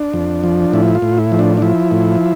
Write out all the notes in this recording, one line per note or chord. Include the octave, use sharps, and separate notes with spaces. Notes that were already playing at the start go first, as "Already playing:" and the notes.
Already playing: D4
F2
F3
A2 E4
F4
A2
E4
F3
D4
D4
F3 E4
A2